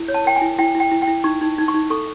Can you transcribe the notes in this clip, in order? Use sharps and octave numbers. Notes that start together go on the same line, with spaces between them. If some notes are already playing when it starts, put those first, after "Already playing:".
Already playing: E4
C#5
A5
A#4 G5
G#5
E4
E4 G5
E4
G5
E4
G5
E4
D#4 C#6
D#4
D#4
C#6
D#4
A4 C#6